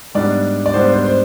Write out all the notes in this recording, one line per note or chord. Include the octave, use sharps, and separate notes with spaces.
G#2 G3 B3 D4 D5
D5
G#2 G3 B3 D4 C5
C5
C5